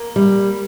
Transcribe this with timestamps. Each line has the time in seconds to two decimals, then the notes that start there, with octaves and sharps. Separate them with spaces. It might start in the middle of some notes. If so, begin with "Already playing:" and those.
Already playing: A#3
0.16 G3